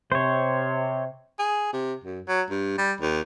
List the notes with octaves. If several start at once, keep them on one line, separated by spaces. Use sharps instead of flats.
C3 C5 C#5
G#4
C3
F#2
F#3
G2
G3
D#2